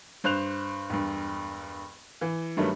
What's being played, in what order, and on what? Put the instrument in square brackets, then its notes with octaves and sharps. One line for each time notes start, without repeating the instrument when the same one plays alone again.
[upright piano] G2 C5 F#6 F7
E1 G2
E3
G2 D#3 F#3 G3 A3 B3